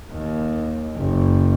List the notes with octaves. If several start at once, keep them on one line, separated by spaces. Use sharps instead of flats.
D#2
F#1